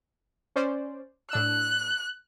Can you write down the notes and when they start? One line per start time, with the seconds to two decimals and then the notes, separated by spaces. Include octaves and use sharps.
0.56 C#4 C5 D5
1.31 A2 D4 E6 F#6